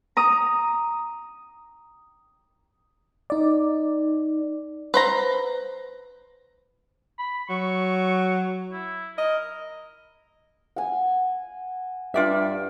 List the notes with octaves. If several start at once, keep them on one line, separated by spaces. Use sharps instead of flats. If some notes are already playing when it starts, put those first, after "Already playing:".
A#5 D#6
D#4 D5
B4 C5 A#5
B5
F#3 C#6
E4
A#4 D#5
F#5 G#5
G2 F4 D5 E5